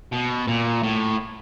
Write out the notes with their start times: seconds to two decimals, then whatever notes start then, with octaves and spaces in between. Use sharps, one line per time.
0.12 B2
0.48 A#2
0.83 A2